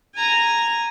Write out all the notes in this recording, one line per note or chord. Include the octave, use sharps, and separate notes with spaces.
G#5 A#5